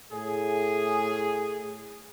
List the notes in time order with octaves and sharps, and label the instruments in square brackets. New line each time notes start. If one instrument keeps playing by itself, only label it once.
[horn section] A2 G#4